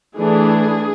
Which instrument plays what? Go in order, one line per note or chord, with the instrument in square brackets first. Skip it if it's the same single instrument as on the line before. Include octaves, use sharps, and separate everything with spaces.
[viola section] E3 A3 D4 G#4